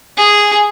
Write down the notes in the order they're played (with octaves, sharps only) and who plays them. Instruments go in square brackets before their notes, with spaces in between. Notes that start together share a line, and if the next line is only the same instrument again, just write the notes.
[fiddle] G#4